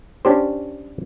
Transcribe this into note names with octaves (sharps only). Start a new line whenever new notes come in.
C#4 D4 G4 C5